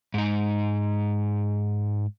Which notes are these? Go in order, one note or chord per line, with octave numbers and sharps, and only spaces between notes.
G#2 D#4